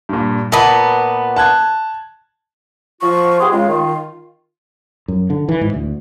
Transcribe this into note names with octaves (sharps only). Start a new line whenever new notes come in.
G2 A#2
A#2 B3 A5
A5 F#6 G#6
F3 F4 C#6
B3 G4 G#4 C6
C#3 G#3 F4
D#3
F#2
D3
E3
G#2
D2